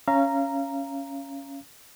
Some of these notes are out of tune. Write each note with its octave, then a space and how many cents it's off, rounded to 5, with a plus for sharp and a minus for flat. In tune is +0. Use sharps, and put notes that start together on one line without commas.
C#4 +0 F5 -30 A#5 +0